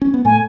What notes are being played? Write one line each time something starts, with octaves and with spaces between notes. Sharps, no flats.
C#4
B3
A2 A3 G#5